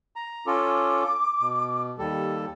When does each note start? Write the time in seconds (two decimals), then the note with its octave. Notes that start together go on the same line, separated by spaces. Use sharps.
0.16 A#5
0.46 C#4 F4 A4 D6
1.41 B2
1.98 D#2 G3 A4